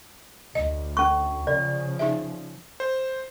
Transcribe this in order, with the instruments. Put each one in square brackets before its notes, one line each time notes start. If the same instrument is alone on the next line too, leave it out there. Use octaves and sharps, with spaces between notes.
[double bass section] D2 [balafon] D#5
[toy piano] C#4 C#6
[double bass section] C#3 F3 [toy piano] D5
[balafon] D#4 G#4 E5
[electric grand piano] C5